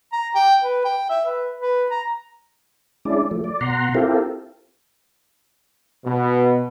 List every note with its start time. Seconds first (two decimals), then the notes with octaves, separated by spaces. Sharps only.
0.13 A#5
0.35 G5
0.64 B4
0.85 G5
1.10 E5
1.27 B4
1.61 B4
1.91 A#5
3.05 G#3 C#4 D4 E4 D5
3.31 F3 A3
3.44 D5
3.61 B2 F#5 A#5 C6
3.95 C4 E4 F4 G4 A4 A#4
6.05 B2